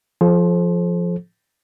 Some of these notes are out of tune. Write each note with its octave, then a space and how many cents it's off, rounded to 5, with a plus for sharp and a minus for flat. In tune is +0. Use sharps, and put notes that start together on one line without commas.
F3 +0 A4 -35 C5 +15